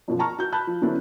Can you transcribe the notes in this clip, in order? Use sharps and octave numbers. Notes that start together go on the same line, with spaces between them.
F#2 B2 F3
A5 A#5 C#6 F6
F#4 G6
A5 B5 F#6 G6
F3
D3 F#3 B3 C#4 D4 E4